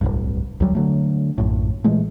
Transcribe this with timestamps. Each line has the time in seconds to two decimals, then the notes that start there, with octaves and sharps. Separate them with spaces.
0.01 D1 G1 C2 G2
0.60 D2 F#3 G3
0.75 D3 F#3 A3
1.38 A#1 F#2 A2
1.84 A#2 E3 G#3 A3